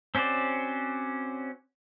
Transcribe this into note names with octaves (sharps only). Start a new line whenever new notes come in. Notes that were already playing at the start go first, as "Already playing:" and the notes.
C4 C#4 F#4 C5 D5